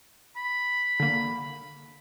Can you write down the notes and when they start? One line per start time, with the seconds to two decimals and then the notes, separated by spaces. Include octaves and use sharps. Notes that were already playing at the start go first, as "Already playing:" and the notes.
0.36 B5
1.00 D3 A#3